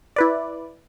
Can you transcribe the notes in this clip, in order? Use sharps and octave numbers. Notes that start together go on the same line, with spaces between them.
E4 B4 D5